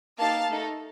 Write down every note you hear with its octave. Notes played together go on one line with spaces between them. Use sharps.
A#3 D#4 G4 F5 A5
A3 D#4 A4